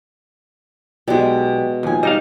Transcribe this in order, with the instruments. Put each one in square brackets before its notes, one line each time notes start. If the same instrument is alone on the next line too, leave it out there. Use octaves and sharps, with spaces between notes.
[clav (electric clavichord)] B1 [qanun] B2 G#3 [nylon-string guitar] G4 D5
[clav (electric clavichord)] D#2 [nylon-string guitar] F3 G#5
[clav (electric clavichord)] G3 D#4 F5 [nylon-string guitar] D#5